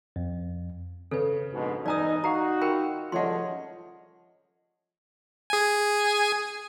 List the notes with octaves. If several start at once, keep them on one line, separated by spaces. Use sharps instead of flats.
F2
C#3 A4 B4
A#1 G#2 B2
E1 D#4 D5 G#5 A#5 D#6 E6
D#4 F#4 F5 A#5 C#6 C7
F4 A#4 G5 B5 C#7
C#2 F3 G3 A3 C#5 D#5 F#5 C6
G#4 G#5